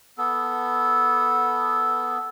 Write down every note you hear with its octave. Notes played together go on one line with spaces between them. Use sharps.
B3 A4